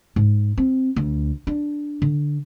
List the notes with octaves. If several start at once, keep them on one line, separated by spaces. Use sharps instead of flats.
G#2
C4
D2
D4
D3